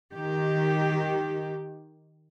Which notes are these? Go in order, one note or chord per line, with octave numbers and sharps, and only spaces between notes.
D#3 G4